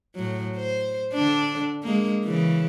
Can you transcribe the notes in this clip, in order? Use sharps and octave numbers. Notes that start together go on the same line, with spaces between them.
A2 F#3
C5
D3 D4
G#3 A#3
C#3 E3